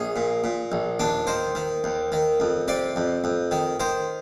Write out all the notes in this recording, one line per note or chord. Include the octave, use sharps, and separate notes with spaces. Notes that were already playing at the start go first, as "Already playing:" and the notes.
Already playing: A#1 G#4
A#2
A#2
A#1
D#2 D4
D#3 C5
D#3
D#2
D#3
F2
C3 D5
F2
F2
D#3
D#3 C5